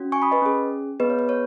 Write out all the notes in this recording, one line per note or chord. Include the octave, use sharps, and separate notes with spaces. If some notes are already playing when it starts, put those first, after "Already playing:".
Already playing: C#4 F#4
G#5 C#6
B5 D#6
B4 D#5
C#4 G#4
B3 G#4 B4 D#5
C#5
B4
C#5